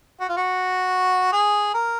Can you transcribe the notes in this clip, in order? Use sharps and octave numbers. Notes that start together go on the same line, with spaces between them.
F#4
F4
F#4
G#4
A#4